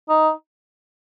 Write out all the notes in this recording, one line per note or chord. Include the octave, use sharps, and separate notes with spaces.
D#4